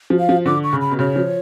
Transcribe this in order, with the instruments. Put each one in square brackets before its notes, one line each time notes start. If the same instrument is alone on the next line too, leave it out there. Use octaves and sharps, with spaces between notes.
[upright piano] F3
[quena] F5
[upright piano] F3
[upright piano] D3 [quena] D6
[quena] C#6
[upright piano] C#3
[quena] B5
[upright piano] B2
[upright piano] C#3 [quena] C#5
[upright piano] F3